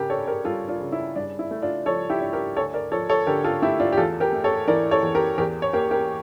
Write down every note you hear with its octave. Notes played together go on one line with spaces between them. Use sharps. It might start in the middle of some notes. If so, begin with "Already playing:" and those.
Already playing: C#3 G4 A#4
D4 A4 C#5
G4 A#4
G3 F4 A4
D4 F4
C#3
E4
G2 D4
E4
A3
D4 F4
F3 A4 C#5
E4 G4
D4
G4 A#4
D2 A4 C#5
A#4 D5
F3 A4 C#5
A4 C#5
D3 G4 A#4
F4 A4
A3 E4 G4
D4 F4
G4
E2 F4 A4
G4 A#4
A3
A4 C#5
E3 A#4 D5
A4 C#5
E2
G4 A#4
E2 G4 A#4
C#5
A#3 G4 A#4
G4 A#4